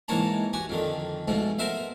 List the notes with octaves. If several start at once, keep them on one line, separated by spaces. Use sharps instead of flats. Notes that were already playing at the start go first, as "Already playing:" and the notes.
G#2 E3 A#3 C#5 A5 A#5
F#4 G4 G#5
F2 D3 D#3
G#2 B2 F3 A3
B3 A#4 C5 E5 F5